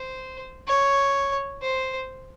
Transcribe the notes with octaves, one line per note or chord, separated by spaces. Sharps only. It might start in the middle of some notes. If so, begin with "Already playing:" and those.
Already playing: C5
C#5
C5